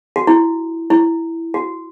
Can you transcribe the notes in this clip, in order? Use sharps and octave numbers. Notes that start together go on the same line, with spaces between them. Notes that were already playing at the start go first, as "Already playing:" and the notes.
F#4
E4
E4
F#4